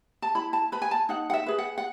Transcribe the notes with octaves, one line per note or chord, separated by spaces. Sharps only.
A5
E4 B5
A5
B4 B5
G#5
A5
D#4 F#5
F#5
E5
G#4 B4
F#5
F#5